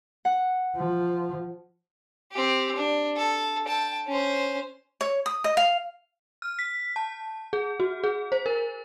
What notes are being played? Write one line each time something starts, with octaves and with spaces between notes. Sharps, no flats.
F#5
F3
C4 G4
D4
A4
G5 A5
C#4 C5
C#5
D#6
D#5
F5
F6
B6
A5
G#4
F#4
G#4
C5
A#4